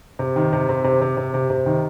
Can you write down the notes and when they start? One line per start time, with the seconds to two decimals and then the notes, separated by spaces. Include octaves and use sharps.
0.19 C3
0.36 D#3
0.53 C3
0.69 C3
0.84 C3
1.01 C3
1.17 C3
1.34 C3
1.50 C3
1.66 D#3